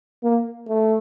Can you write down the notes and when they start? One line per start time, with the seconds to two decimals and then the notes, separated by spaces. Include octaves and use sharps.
0.23 A#3
0.68 A3